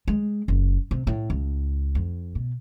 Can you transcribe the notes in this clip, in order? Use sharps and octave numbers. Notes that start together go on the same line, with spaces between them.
G#3
F#1
C3
A2
C#2
F2
B2